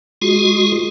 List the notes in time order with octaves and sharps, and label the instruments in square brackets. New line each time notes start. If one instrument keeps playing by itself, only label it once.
[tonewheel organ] G#3 F4 F#4 G#4